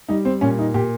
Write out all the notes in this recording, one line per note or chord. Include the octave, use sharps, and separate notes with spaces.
G3 D#4
C4
A#2 C#4
D#4
A#2 G4